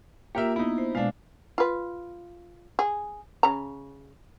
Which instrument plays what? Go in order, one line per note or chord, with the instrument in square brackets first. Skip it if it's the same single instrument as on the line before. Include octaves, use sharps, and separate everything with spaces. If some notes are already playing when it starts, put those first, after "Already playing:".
[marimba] A#3 F4 [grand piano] G4 A#4 E5
[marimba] B3 [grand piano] D#4 E4
[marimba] C5
[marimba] B2 G#3 [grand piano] D4 F5
[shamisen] F4 B4
G#4
C#3 A#5